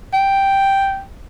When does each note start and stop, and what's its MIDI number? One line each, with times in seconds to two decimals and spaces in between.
0.13 1.01 79